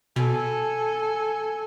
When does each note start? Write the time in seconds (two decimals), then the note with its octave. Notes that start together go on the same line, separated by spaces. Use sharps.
0.16 B2 A4 G#5